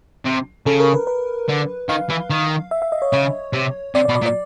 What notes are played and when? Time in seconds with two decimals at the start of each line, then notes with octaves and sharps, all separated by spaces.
0.25 C3
0.66 C#3 A4
0.80 A#4
0.94 B4
1.07 B4
1.48 D3
1.89 D#3 F5
2.10 E3
2.30 D#3
2.71 E5
2.82 E5
2.92 D#5
3.02 C#5
3.13 C#3 C#5
3.53 C3
3.95 C3 D5
4.05 D5
4.09 B2
4.15 D5
4.22 A#2
4.26 D5